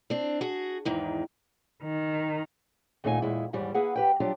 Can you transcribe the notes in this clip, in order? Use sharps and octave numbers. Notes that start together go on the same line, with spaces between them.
C4 D4
F#4 G#4
E2 G#2 D#3
D#3
D#2 A#2 A3 D#4 F#4 G#5
E2 A#2 G#3 E4
D#2 G#2 E3 G3 D5
A#3 E4 G#4 B4 F#5
G4 B4 G5
F#3 G3 D4 F4 G4